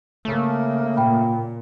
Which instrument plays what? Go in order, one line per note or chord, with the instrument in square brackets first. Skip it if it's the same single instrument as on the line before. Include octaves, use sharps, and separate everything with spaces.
[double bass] C#3 A#3 [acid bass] A3
[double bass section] A#2 [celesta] G5 B5